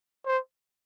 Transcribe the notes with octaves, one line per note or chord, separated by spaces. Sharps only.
C5